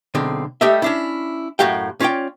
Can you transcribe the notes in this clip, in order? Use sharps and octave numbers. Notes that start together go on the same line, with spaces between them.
B1 D3 G#3 C4
G3 A3 G4 D#5 E5
C#4 D4 E4
F#2 A2 F#4 G4 F5 G5
C#4 F4 C#5 D5 G5